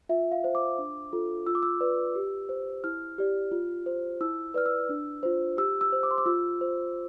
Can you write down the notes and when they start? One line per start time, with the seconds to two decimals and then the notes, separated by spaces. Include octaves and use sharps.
0.09 F4 E5
0.32 F5
0.44 C5
0.55 D6
0.78 D4
1.13 F4 A4
1.47 F4 E6
1.55 D6
1.63 E6
1.80 B4 D5
2.16 G4
2.49 C5
2.84 E4 F6
3.18 G4 D5
3.51 F4
3.86 C5
4.21 E4 E6
4.54 B4 D5 F6
4.66 E6
4.89 D4
5.23 F4 C5
5.57 G4 E6
5.81 E6
5.93 C5
6.03 D6
6.11 C6
6.18 D6
6.26 F4 E6
6.61 C5